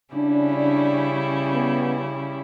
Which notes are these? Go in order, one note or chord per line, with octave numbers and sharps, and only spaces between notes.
C#3 G3 C#4 D4 E4
B3